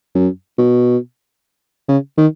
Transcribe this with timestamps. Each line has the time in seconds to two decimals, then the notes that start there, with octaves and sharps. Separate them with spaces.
0.15 F#2
0.58 B2
1.88 C#3
2.18 D#3